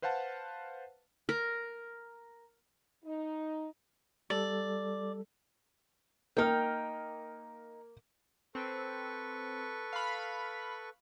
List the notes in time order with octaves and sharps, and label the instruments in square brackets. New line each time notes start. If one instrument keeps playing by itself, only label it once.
[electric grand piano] B4 C5 F5 F#5 A5
[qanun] A#4
[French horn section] D#4
[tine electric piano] G3 A4 [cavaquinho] D5
[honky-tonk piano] A#3 A#4 F6 [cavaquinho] D#4 G5
[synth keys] C4 [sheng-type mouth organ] A4 B4 C#6
[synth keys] F5 B5